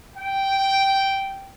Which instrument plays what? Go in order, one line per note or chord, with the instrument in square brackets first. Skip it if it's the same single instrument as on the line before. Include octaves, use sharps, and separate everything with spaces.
[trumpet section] G5